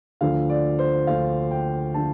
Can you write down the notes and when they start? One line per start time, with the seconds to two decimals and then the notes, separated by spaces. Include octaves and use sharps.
0.21 D2 D3 F3 F5
0.50 D5
0.79 C5
1.07 D2 D3 F3 F5
1.51 G5
1.94 D3 F3 A5